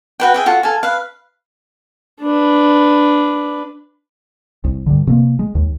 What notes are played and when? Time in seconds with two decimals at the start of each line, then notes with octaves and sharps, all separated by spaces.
0.20 F#4 B4 G5
0.34 G#4 E5 G5
0.46 F4 F#4 A4
0.63 A4 F5 G#5
0.83 B4 F5
2.22 D4 B4
4.64 C2
4.86 G2 D3
5.07 C3 A#3
5.39 G#3
5.55 D#2